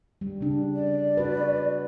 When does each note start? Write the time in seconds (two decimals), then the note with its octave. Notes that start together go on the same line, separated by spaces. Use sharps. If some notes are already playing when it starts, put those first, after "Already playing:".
0.21 G3
0.41 C#3 D4
0.75 D5
1.17 F#4 B4